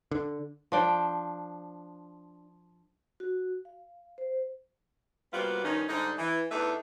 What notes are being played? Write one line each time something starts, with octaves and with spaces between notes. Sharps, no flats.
D3
F3 D4 G5
F#4
F5
C5
C3 G3 A#3 B3 F4 F#4
G2 D#3 F3 C#4 D#4
G#2 D3 G3 D#4
E3
E2 A3 D4 D#4 B4 E5